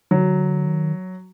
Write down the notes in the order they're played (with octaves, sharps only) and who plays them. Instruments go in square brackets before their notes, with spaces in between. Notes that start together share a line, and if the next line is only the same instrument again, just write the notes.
[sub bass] D3 [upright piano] F#3
[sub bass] D#3